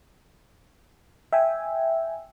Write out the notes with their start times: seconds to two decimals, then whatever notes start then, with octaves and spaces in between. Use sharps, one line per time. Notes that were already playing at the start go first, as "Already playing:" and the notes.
1.33 E5 G5 G#5